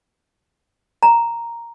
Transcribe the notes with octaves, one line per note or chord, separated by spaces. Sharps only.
A#5